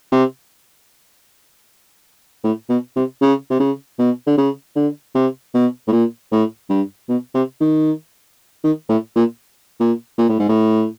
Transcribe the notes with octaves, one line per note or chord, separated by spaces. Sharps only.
C3
A2
B2
C3
C#3
C3
C#3
B2
D3
C#3
D3
C3
B2
A2
A#2
A2
G2
B2
C3
D#3
D#3
A2
A#2
A#2
A#2
A2
G#2
A2